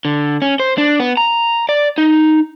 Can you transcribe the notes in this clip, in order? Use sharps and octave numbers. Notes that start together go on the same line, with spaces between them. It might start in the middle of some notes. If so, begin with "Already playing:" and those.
D3
C#4
C5
D4
B3
A#5
D5
D#4